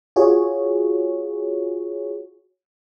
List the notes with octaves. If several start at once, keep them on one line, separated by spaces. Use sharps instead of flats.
F4 F#4 G#4 C#5